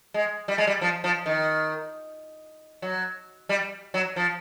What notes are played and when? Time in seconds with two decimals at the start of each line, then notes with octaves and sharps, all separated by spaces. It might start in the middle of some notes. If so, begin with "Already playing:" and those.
0.14 G#3
0.48 G3
0.58 G#3
0.67 G3
0.81 F3
1.04 F3
1.26 D#3
2.82 F#3
3.49 G3
3.94 F#3
4.16 F3